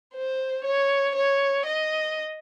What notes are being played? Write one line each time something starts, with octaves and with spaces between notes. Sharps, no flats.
C5
C#5
C#5
D#5